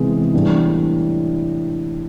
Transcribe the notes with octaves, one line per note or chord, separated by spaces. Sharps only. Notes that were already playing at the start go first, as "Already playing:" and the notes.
Already playing: C3 E3 G#3 B3 E4
A2 E3 G3 B3 D4